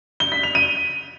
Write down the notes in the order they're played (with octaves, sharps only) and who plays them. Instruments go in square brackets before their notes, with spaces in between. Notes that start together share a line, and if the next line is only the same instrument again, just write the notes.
[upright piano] G7
B6
F7
D#7